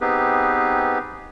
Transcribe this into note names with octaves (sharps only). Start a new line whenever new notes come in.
B3 C4 D#4 G4 G#4 B4